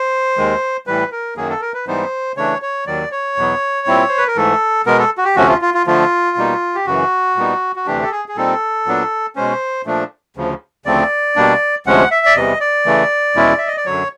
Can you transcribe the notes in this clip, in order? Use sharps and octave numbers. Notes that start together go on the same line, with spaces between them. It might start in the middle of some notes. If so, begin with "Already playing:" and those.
Already playing: C5
D#2 D#3 G#3
A2 E3 G3 B4
A#4
F#2 D#3 F#3 A#3 G#4
A4
A#4
B4
G#2 E3 G3 B3 D#4 C5
C#3 E3 A3 D4 C#5
C#5
D#2 D#3 F#3 D5
C#5
E2 B2 F#3 B3
A#2 G3 C4 E4
C5
B4
A#4
G#2 E3 A3 A4
B2 G#3 B3 A#4
A4
F#4
G4
D2 C3 F3 A3 C#4 F#4
F4
F4
F4
D3 F3 A3 F4
B2 G3 A#3 D#4
G4
F#2 C#3 E3 F#4
A#2 G3 B3 D#4
F#4
D2 C3 E3 A3 D4 G4
A4
G#4
G#4
A#2 G3 C4 D#4 A4
A#2 F#3 B3 D4
B2 G#3 C#4 C5
A#2 F3 A3 D4
D2 C#3 F3
D2 C#3 F3 A3 C4 D5
B2 G3 A#3 D4
D2 C3 F3 G#3 C#4 F#5
E5
D5
E2 C3 E3 G3 D#5
D5
C#3 E3 A3
E2 B2 G#3 C#4 E4
E5
D#5
D5
F#2 D3 F#3 C#5